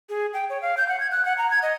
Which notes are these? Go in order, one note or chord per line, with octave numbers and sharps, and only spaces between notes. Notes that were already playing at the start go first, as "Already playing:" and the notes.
G#4
G5
C#5
F5
G6
F#5
G#6
F#6
F#5
A#5
G#6
D#5